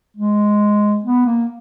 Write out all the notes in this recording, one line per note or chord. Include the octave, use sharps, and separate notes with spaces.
G#3
B3
A#3